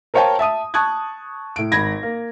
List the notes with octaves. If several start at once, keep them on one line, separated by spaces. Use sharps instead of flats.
A#4 C5 C#5 F5 G5 A5
E5 A5 D#6 D#7
A5 C#6 D#6 F#6 G#6
A2 D7
G#1 B5 G#6 A#6
A#3